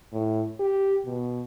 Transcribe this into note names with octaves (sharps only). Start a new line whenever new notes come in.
A2
G4
B2